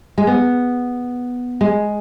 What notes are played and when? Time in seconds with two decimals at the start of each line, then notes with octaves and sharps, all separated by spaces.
0.18 G#3
0.27 B3
1.61 G#3